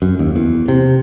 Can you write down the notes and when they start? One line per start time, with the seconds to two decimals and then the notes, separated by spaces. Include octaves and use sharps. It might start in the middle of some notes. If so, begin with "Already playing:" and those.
0.02 F#2
0.19 D#2
0.36 E2
0.68 C3